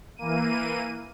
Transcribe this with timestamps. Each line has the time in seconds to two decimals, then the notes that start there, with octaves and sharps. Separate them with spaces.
0.16 E3 A#3 D#7